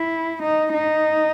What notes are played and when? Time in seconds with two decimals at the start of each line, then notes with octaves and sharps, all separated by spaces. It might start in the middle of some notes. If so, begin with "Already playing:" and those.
Already playing: E4
0.43 D#4
0.74 D#4